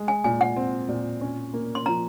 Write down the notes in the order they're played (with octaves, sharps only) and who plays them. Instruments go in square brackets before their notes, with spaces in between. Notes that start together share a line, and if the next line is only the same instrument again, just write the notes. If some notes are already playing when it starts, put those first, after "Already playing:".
Already playing: [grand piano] G#3
[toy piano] G#5
[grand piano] A#2 [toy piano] G#5
[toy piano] F#5
[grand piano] C4
A#2
C#4
A#3
[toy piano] C6
[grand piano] F3 [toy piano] A#5